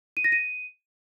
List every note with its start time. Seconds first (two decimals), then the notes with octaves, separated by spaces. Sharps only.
0.17 D#7
0.24 A#6
0.32 D#7